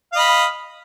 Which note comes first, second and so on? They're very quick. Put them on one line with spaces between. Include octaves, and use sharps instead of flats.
F5 D#5 B5